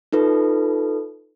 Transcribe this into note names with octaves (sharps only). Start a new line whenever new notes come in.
D#4 F4 A4 B4